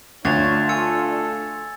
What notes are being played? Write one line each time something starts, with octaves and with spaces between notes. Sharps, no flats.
D2 D4 F4 C#5 G#6 A6 F7
A4 G#5 E6 C#7